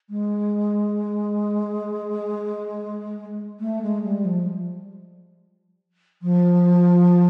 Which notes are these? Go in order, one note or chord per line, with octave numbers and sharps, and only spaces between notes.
G#3
A3
G#3
G3
F3
F3